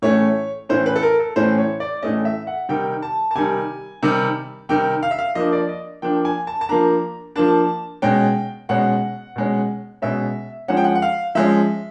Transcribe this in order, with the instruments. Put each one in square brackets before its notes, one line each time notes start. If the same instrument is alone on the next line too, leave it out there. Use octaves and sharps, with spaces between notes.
[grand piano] A2 E3 A3 C#4 C#5
A2 E3 A3 C#4 C5
B4
A4
A#4
A4
A2 E3 A3 C#4 C5
C#5
D5
A2 E3 A3 C#4 D#5
E5
F#5
C3 D#3 G3 G5
A5
A5
C3 D#3 G3 G#5
C3 D#3 G3
C3 D#3 G3 G5
F5
E5
F5
F3 A#3 D4 D#5
D5
D#5
F3 A#3 D4 G5
G#5
A5
A5
F3 A#3 D4 A#5
F3 A#3 D4 A5
B2 G#3 C#4 G5
B2 G#3 C#4 F#5
B2 G#3 C#4
B2 G#3 C#4 E5
F3 G#3 C#4 F#5
G5
F#5
F#5
F5
F3 G#3 C#4 E5